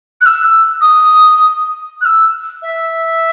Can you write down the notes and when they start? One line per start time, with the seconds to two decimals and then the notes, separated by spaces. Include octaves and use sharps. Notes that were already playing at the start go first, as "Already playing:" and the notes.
0.21 F#6
0.26 E6
0.81 D#6
2.01 F#6
2.05 E6
2.62 E5